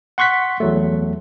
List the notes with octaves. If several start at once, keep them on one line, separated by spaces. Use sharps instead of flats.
F#5 C6 C#6 F#6 B6
E2 F#3 A3